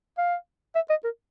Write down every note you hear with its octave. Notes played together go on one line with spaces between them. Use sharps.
F5
E5
D#5
A#4